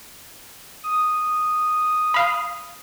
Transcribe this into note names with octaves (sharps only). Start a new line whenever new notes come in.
D#6
F5 B5